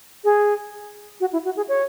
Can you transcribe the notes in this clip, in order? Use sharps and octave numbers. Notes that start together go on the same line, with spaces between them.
G#4
F#4
E4
F#4
G#4
C#5